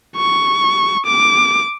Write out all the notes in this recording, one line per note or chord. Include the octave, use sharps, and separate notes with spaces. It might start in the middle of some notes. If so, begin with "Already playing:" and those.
C#6
D6